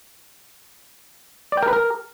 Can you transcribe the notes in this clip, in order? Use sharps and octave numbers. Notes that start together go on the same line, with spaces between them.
D5
G5
A#4
B4
A#4